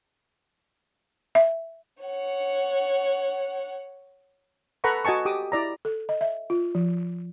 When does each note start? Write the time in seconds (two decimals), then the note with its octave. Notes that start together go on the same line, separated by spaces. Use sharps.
1.35 E5
2.03 C#5 F#5
4.84 A4 B4 F#5 A#5 B5 C#6
5.05 F#4 D#5 G#5 A5 C#6
5.25 G4 D6 D#6
5.52 E4 D5 A#5
5.85 A4
6.09 D#5
6.21 E5
6.50 F4
6.75 F3